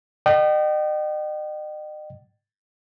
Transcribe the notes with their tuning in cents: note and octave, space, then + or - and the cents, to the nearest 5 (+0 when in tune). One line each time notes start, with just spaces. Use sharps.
D#5 -40 G5 -35